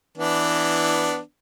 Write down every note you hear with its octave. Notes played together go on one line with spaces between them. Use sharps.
E3 B3 D4